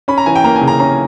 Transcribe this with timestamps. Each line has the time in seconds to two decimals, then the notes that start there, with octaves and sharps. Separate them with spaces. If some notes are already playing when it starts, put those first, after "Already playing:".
0.08 C#4 B5
0.18 A#5
0.26 E3 G#5
0.36 G5
0.44 A#3 A#5
0.56 G#5
0.61 C#3
0.68 A#5
0.80 C#4 A#5